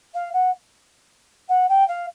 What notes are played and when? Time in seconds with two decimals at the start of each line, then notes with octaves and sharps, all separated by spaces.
0.14 F5
0.33 F#5
1.48 F#5
1.69 G5
1.88 F5